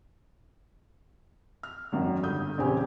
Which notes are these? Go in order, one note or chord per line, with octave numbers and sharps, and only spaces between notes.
F6
G#1 F#2 D#3
G1 D#6 G6
A#1 E2 C#3 C4 G4 G#5